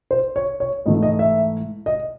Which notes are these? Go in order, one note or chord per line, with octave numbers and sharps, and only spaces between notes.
C5
C#5
C#5
G#2 E3 A3 D#5
D#5
E5
D#5